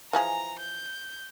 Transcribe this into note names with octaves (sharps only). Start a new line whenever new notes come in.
E3 F3 G#4 A#5
G6